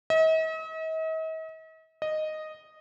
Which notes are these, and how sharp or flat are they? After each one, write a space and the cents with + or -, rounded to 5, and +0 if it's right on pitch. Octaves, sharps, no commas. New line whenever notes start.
D#5 +45
D#5 -5